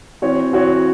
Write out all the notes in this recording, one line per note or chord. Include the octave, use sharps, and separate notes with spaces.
E3 C4 F#4 C#5
E3 C4 F#4 C#5